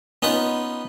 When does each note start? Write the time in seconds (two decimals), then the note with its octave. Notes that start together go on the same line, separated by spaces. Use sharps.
0.22 B3 C#4 D#4 F4 B4